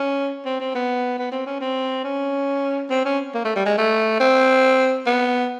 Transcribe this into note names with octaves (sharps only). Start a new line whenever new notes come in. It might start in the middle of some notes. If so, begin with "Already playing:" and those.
Already playing: C#4
C4
C4
B3
B3
C4
C#4
C4
C#4
C4
C#4
A#3
A3
G3
G#3
A3
C4
B3